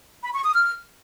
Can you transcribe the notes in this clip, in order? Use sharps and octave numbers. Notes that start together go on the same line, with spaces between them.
B5
C#6
D#6
F6